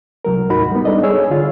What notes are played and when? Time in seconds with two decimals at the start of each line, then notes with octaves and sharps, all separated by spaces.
0.25 C2 F#3 A#4
0.50 D#2 A2 D#4 F#4 B5
0.71 G3 B3
0.85 G3 D4 D#4 A4 D5 D#5
1.03 G#4 C#5 E6
1.30 D3 F4